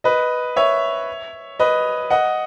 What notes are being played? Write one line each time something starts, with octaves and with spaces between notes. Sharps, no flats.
B4 D#5
C#5 E5
B4 D#5
D#5 F#5